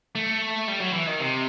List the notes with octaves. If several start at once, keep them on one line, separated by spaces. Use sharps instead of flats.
A3
G3
F#3
E3
D#3
C3